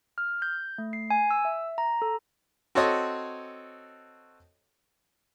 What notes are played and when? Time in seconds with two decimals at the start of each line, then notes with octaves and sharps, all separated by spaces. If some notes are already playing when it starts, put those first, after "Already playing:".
0.18 F6
0.42 G6
0.78 A3
0.93 C7
1.10 G#5
1.31 E6
1.45 E5
1.78 A#5
2.02 A4
2.75 C4 F#4 A4 C#5 D#5